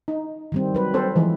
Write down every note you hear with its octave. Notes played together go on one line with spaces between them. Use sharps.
D#4
D#3 G3 C4
F#3 B4
C4 A4 C5
E3 F3 G#3